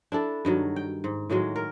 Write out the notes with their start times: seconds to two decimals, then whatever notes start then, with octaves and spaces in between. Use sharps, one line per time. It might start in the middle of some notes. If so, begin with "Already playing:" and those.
0.12 D4 E4 A4
0.45 G2 D#3 F#3
0.76 G5
1.04 G#2
1.30 A2 D#3 F#3 G#3
1.56 A#4